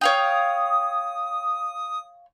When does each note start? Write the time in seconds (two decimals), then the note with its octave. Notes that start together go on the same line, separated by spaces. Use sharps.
0.01 C#5 F5 G5 D#6